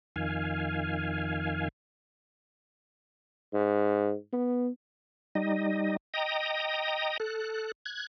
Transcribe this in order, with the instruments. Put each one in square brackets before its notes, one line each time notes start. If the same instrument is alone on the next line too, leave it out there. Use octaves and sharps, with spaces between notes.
[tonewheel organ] F2 D#3 F5 G#5
[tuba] G#2
B3
[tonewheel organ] G3 D#4 D#5
D#5 G5 A#5 D#6
A4 F#6
F#6 G#6